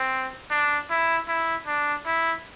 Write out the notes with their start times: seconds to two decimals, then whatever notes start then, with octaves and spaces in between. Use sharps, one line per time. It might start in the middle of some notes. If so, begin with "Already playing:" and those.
Already playing: C4
0.51 D4
0.90 E4
1.28 E4
1.67 D4
2.06 E4